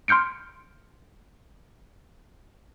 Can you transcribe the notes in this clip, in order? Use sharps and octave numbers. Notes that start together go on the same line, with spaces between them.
C6 F6 G6 C#7 D7